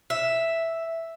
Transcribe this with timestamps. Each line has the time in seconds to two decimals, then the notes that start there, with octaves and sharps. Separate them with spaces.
0.10 E5